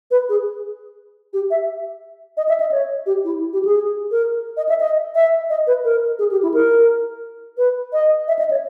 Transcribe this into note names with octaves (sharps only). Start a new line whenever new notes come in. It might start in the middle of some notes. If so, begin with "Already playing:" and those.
B4
G#4
G4
E5
D#5
E5
D#5
C#5
G4
E4
G4
G#4
A#4
D#5
E5
D#5
E5
D#5
B4
A#4
G#4
G4
E4
A#4
B4
D#5
E5
D#5
C#5